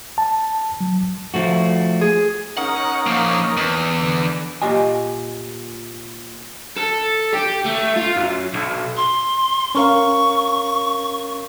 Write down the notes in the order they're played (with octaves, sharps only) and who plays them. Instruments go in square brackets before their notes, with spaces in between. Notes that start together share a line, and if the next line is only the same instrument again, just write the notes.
[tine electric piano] A5
F#3
[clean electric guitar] F3 A3 F#4
[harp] G#4
[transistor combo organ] C#4 D#4 A#4 [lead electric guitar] F#5
[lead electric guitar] F3 A#3
E2
[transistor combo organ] D3
[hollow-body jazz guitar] A#2 G4 D#5 G#5
[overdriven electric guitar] A4
G4
A3
F4
F#2
B1
[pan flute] C6
[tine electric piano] C#4 A#4 F5 [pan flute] C#6